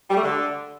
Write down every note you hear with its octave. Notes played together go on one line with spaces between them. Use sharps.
G3
A3
D3